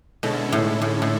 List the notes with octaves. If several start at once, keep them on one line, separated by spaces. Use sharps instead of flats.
B2 D3 G#3 C#4 E4 A4
A2
A2
A2